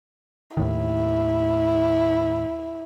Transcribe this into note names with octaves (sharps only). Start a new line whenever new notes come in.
D#2 A2 D#3 E4